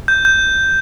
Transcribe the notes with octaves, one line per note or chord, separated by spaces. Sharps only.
G6
G6